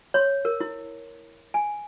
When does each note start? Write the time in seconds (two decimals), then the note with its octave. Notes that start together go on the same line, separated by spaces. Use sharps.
0.14 C#5
0.45 A#4
0.61 E4
1.54 G#5